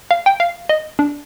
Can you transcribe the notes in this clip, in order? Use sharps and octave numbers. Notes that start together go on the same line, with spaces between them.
F5
G5
F5
D#5
D4